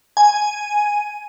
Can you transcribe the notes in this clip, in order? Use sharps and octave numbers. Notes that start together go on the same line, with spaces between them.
G#5